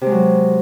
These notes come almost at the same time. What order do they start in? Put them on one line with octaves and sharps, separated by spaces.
C3 G#3 F#3